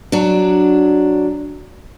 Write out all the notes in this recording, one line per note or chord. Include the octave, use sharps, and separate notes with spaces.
F#3 D4